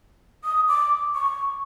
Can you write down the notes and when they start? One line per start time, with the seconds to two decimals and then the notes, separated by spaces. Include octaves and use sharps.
0.44 D#6
0.68 D6
1.15 C#6